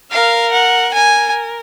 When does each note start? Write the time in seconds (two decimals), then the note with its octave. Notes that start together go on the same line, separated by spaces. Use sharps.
0.11 A#4 F5
0.52 F#5
0.93 A#4 G#5